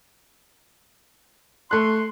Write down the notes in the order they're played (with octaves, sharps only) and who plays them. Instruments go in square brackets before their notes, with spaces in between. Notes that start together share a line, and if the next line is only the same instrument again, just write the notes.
[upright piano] A3 F#6 [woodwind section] C6